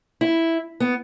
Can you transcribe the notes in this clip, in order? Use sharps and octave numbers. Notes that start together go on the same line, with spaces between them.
E4
B3